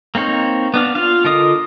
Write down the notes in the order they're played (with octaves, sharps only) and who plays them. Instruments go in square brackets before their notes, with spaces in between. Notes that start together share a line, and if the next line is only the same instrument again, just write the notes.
[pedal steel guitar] A#3 C4 D#4 C#5
B3 D4 F5
F4 F5
D3 F4 A#4 D#5 D#6